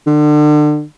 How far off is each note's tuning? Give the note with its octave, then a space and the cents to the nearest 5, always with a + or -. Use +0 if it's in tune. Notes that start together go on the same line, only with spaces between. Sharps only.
D3 +35